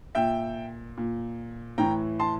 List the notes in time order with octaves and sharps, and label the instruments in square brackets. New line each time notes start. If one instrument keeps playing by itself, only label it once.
[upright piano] A#2 E5 G5
A#2
A2 E3 G5 A#5
A5 C6